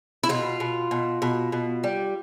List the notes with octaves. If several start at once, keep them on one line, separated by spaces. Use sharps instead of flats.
E4
B2 F4
B2
B2
B2
B2
G3